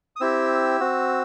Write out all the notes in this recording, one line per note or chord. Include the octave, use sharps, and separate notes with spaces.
D#6
C4 E4 G4 E6
C4 F#4